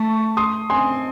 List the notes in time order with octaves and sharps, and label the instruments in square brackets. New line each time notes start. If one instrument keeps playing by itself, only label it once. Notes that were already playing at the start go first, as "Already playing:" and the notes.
Already playing: [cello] A3 [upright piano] A5 C#6
[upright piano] C6 D#6
[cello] C4 [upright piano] G#5 C6